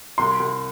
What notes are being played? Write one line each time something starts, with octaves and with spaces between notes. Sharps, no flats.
C2 C6
C2